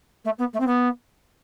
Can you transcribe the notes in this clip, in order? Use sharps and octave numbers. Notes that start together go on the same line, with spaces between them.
A3
B3
A3
C4
B3